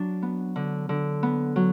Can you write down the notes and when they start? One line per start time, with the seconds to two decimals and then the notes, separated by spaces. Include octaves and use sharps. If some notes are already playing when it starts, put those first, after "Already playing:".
Already playing: F#3 D4
0.22 B3
0.56 D3
0.89 D3
1.23 B3
1.56 F#3